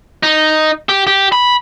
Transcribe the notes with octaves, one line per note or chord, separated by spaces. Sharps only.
D#4
G4
G4
B5